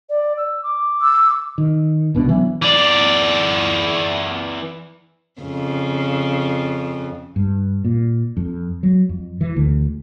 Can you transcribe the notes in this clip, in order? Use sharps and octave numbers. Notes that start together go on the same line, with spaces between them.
D5
E6
D6
E6
D#3
C2 B2 F#3 D4
E3 F#3 B3
E3 D5
F2 C#3
G2
A#2
F2
F#3
F2
E3
D2